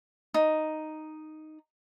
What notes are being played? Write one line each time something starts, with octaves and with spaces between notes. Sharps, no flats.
D#4